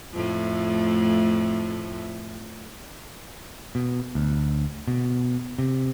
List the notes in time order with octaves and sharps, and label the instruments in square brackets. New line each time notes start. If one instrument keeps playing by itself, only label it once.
[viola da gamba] F2 A2 A3
[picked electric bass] B2
D2
B2
C3